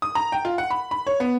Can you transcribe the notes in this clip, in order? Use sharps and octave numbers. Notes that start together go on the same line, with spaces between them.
D#6
A#5
G5
F4
F#5
B5
B5
C#5
B3